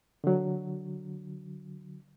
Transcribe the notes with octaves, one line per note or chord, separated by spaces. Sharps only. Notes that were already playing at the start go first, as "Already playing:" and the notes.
D3 F#3